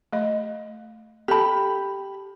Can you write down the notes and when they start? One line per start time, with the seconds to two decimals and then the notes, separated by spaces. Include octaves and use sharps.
0.13 A3 D#5
1.28 G4 A4 A5 B5